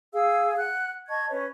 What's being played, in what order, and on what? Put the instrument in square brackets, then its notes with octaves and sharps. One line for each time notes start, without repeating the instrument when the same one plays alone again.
[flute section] G#4 F5 E6
F#5 F#6
D#5 A5 C#6 G#6
C#4 B4 C#5